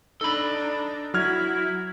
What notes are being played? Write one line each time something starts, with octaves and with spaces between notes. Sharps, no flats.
D4 D#4 A4 B5
F#3 E4 F#4 F6 G#6